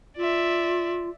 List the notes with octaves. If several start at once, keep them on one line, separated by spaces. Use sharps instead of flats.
F4 D5 E5